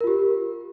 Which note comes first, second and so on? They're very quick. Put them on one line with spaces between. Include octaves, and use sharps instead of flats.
A#4 F4 G4